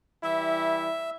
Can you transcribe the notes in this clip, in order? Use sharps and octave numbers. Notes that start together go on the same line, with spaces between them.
E3 G3 E4 E5